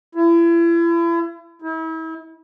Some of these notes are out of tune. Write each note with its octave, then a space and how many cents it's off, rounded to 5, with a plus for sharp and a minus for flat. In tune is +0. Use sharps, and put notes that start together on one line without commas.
E4 +35
E4 -40